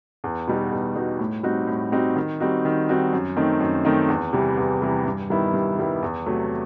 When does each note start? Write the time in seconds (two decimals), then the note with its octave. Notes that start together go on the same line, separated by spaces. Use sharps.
0.24 E2
0.47 B2 G3 D#4 F#4
0.72 E2
0.95 B2 G3 D#4 F#4
1.19 A2
1.43 G3 C4 D#4 F#4
1.67 A2
1.92 G3 C4 D#4 F#4
2.16 D#3
2.40 G3 C4 D#4 F#4
2.65 D#3
2.89 G3 C4 D#4 F#4
3.13 F#2
3.36 D#3 A3 C4 D#4
3.60 F#2
3.85 D#3 A3 C4 D#4
4.09 E2
4.33 C3 E3 G3
4.57 E2
4.82 C3 E3 G3
5.06 G2
5.30 D#3 G3 B3 E4
5.54 G2
5.78 D#3 G3 B3 E4
6.03 E2
6.26 C3 F#3 A3